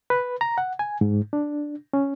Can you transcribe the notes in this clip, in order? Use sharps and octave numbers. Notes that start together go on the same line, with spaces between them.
B4
A#5
F#5
G#5
G#2
D4
C#4